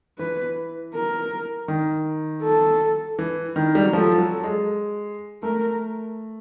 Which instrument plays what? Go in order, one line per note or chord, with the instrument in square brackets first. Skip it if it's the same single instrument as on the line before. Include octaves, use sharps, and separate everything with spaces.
[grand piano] E3 [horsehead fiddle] B4
[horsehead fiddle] A#4
[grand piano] D#3
[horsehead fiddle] A4
[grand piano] E3
D#3
G3
F#3
[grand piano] F3 [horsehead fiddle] A4
[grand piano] F#3
G#3
[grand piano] A3 [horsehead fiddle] A#4